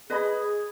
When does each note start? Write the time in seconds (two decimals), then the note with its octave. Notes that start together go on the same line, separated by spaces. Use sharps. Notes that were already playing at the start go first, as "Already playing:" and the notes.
0.09 G#4 B4 D#5 B5
0.38 G#4